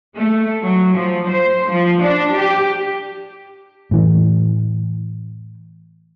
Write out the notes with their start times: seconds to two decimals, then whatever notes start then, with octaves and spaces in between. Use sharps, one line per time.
0.16 A3
0.63 F#3
0.96 F3
1.29 C5
1.71 F3
2.02 D4
2.37 G4
3.91 A2 E3